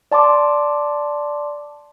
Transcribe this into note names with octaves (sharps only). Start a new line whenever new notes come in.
D5 A5 C6 D6